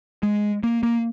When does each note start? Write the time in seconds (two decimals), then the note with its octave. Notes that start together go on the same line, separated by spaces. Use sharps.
0.23 G#3
0.63 A#3
0.83 A#3